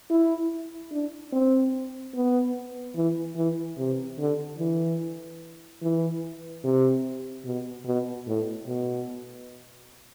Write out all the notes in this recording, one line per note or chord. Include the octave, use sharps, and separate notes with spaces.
E4
D4
C4
B3
E3
E3
C3
D3
E3
E3
C3
B2
B2
A2
B2